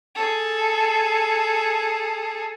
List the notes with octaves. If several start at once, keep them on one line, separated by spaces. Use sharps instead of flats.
G#4 A4